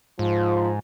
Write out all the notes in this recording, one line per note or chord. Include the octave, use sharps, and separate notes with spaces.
G#2 F3